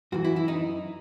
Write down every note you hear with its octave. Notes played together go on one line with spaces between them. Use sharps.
F#2 E3 F#4
E4
E4
D#4